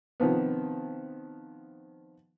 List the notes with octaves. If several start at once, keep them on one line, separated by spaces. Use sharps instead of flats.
C3 D#3 F3 B3